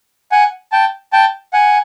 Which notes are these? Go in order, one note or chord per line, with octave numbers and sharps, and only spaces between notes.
F#5 G#5
G5 A5
G5 A5
F#5 G#5